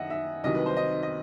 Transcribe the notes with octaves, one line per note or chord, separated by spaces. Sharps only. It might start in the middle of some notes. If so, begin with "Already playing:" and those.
Already playing: F#2 D#3 D#5 E5 F#5
E5
C2 C3 D#3 F#3 D#5
B4
C5
D#5
D#5